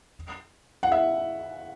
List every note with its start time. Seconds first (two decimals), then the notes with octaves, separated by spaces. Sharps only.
0.83 F#5
0.92 E5